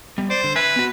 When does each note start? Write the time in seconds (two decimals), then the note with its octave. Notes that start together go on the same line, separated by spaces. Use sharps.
0.18 G3 B3
0.30 C5 D5
0.44 D3
0.56 B4 E5 G#5
0.76 B3 F#4